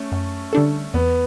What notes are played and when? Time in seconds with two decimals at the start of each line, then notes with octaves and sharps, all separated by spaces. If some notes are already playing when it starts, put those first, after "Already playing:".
Already playing: A3 C#4
0.12 F#2
0.53 D3 G3 D4 A4
0.94 E2 B3